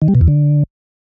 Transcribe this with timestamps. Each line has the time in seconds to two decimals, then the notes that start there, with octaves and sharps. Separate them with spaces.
0.02 D#3
0.08 G3
0.15 B2
0.21 E2
0.28 D3